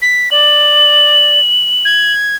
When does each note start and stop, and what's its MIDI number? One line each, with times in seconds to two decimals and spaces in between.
0.02 0.29 95
0.31 1.40 74
0.31 2.12 102
1.85 2.36 92